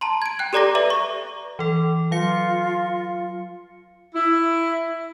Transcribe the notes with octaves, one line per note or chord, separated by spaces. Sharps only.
A5 A#5 C6
G#6 D7
G5 F#6
G4 A4 D5 A#5 D6 A#6
B4 D5 E5 A#5
C#6
E3 A4
F#3 F4 F5 C#7
E4